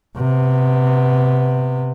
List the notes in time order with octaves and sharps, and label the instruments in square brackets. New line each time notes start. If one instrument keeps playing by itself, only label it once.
[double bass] C3 B3